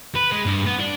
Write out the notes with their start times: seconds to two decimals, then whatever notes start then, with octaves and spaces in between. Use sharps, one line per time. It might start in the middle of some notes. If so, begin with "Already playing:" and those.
0.16 B4
0.32 G#3
0.46 G2
0.66 B3
0.79 D4